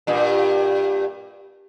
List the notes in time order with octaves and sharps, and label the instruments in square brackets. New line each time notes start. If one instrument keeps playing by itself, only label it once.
[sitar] G2 A#2